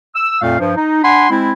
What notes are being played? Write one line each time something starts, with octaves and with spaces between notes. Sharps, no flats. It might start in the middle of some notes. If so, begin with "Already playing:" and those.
E6
F2 A#2 A3 F5
G2 F3
D#4
D4 F#5 G#5 B5 C6
G#3 C4 E4